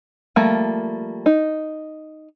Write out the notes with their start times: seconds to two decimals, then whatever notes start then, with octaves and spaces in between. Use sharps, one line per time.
0.36 F3 G3 A3 A#3
1.26 D#4